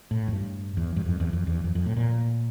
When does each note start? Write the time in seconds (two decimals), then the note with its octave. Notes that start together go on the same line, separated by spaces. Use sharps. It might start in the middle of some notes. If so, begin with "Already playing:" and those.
0.11 A2
0.28 F2
0.32 G2
0.77 E2
0.96 G2
1.06 F2
1.20 E2
1.33 F2
1.47 E2
1.64 F2
1.75 F2
1.86 A2
1.97 A#2